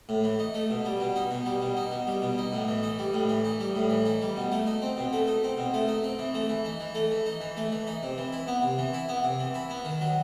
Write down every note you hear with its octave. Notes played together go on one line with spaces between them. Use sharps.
A2
E3
D#4
A3
B2
G3
B2
D#4
B2
G3
B2
D#4
B2
G3
B2
D#4
A2
E3
D#4
G3
A2
E3
D#4
G3
A2
E3
D#4
G3
B2
A3
D#4
C4
B2
A3
D#4
C4
B2
A3
D#4
C4
E3
A3
E3
D#4
E3
A3
E3
D#4
E3
A3
E3
D#4
C3
E3
E4
B3
C3
E3
E4
B3
C3
E3
E4
B3
D#3
F#3